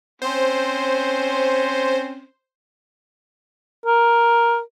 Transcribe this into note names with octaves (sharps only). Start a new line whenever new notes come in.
C4 C#4 C5
A#4